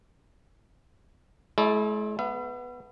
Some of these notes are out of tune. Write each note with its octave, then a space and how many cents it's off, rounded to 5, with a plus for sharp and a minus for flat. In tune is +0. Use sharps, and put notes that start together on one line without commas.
G#3 +45 E4 +0 D5 -5
B3 +0 E5 +40